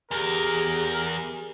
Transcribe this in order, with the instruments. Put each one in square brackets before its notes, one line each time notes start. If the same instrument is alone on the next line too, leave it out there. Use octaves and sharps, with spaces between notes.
[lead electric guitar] E2 [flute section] G4 G#4 [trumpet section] A#4